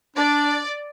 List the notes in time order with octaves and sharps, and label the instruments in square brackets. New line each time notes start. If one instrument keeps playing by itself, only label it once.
[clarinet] D4 [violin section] D5